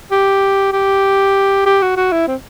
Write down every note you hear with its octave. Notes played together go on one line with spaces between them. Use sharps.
G4
G4
G4
F#4
F#4
E4
C4